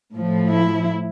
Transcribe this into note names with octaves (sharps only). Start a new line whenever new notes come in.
A2 F3 A3
E4